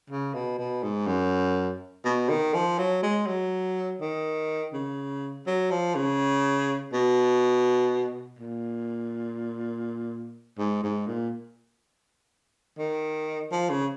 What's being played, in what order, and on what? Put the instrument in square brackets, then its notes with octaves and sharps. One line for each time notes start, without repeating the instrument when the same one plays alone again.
[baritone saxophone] C#3
B2
B2
G#2
F#2
B2
D#3
F3
F#3
G#3
F#3
D#3
C#3
F#3
F3
C#3
B2
A#2
G#2
G#2
A#2
D#3
F3
C#3